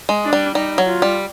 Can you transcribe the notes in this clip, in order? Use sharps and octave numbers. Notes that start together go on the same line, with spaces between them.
G#3
D4
G3
G3 D#4
F#3
F4
G3